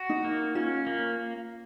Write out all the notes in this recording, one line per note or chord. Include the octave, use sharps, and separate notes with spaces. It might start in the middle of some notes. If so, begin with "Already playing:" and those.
Already playing: F#4
D#4
A#3
C#4 F4
A#3